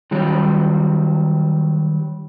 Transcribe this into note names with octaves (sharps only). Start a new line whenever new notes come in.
D#3 F#3 G3